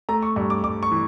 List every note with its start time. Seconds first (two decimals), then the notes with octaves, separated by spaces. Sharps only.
0.09 A3 A#5
0.23 C#6
0.36 G2 C#6
0.50 D6
0.64 G2 D6
0.83 C#6
0.91 E3